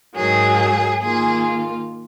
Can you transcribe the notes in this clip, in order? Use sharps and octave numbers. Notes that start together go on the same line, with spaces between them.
G#2 D#3 F#3 G#4
D#3 A#3 F4 G#4